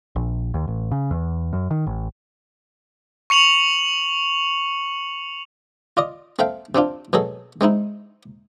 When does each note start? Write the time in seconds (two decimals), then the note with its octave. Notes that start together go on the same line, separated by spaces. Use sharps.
0.16 A#1
0.54 D#2
0.68 A1
0.91 C#3
1.11 E2
1.53 F#2
1.71 D#3
1.87 A1
3.30 C#6 C#7 F7 F#7
5.97 F4 D5 D#5
6.39 C4 A4 E5 F5 G5
6.75 C3 C4 D4 F4
7.13 B2 F#3 G#4 A4
7.61 G#3 C4 D#4 E4